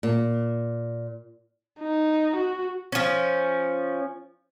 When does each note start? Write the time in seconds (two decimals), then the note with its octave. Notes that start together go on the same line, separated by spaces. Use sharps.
0.03 A#2
1.80 D#4
2.37 F#4
2.92 F3 C#4